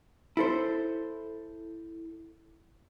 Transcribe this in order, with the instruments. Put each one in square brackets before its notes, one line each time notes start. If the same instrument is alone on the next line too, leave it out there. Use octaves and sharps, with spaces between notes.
[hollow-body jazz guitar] E4 A4 C5